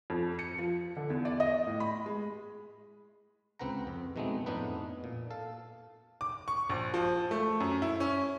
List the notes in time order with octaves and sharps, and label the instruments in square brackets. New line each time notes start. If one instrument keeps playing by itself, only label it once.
[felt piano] F2
C#7
F3
D3
E2
D5
D#5
A2
B5
G#3
[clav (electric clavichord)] C#2 C4 B4 F#5 A#5
F2
B2 D#3 G#3 A3 B3 C4
F2 A2 B3 D4 D#4 B4
A#2
A4 F5
[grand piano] D6
C#6
A#1
F3
A3
F#2
E4
C#4